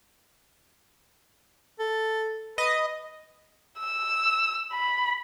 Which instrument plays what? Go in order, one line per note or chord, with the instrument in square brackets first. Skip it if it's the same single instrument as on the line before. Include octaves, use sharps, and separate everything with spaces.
[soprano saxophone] A4
[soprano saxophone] B4 [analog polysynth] D#5
[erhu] E6
B5